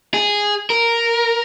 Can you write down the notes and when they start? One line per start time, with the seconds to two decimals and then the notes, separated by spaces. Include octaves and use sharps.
0.14 G#4
0.70 A#4